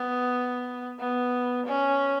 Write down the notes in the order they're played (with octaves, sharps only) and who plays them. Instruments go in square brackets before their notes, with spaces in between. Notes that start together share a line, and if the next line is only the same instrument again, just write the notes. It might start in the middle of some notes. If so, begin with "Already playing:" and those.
Already playing: [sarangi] B3
B3
C#4